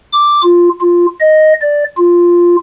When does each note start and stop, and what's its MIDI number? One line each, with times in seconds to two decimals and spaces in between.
0.13 0.41 86
0.43 0.69 65
0.81 1.06 65
1.20 1.53 75
1.61 1.84 74
1.97 2.56 65